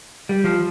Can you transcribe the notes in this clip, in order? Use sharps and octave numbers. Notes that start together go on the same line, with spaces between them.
G3
F3